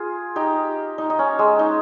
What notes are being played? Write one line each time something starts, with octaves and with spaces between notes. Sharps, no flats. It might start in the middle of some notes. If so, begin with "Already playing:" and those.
Already playing: F4 G#4
D#4 G4
D#4
D#4
C#4
G#3
D#4